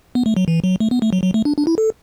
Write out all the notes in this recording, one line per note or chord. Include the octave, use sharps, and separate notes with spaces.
B3
A3
F#3
E3
F#3
A3
B3
A3
F#3
F#3
A3
D4
D4
E4
A4